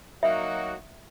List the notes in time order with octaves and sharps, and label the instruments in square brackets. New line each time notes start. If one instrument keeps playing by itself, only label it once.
[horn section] F#3 A#3 D#4 F#4 [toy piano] E5